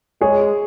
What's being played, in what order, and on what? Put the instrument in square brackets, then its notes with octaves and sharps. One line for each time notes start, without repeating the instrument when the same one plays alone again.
[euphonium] G#3 [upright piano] G#4 C#5